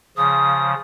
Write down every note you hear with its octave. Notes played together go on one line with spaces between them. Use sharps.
C#3 F3 D#6